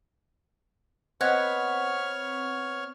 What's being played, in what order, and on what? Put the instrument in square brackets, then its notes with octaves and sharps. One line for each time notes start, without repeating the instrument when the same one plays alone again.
[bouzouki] B3 [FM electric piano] C4 [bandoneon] C#5 C#6 F6 [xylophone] D#5 F#6 G#6